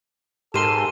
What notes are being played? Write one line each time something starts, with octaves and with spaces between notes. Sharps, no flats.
G#2 G4 A4 A#4 C6 D#7 E7